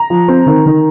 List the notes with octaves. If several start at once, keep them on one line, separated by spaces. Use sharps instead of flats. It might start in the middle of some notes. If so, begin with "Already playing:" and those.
Already playing: A#5
F3
C4
D#3
D#3